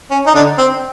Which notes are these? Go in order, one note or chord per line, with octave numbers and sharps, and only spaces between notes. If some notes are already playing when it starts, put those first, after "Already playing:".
C#4
D#4
D3 D4
C4